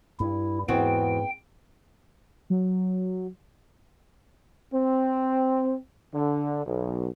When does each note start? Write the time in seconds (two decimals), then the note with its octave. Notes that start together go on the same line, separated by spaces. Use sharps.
0.20 G2 E4
0.68 E2 G#2 B3 C4 F#4 G5
2.50 F#3
4.73 C4
6.14 D3
6.66 B1